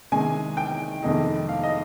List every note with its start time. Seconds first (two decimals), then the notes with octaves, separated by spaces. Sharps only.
0.12 C3 D#3 G#3 G#5
0.57 G5
1.02 F2 C3 D#3 G#3 D#4
1.49 F5
1.63 D#5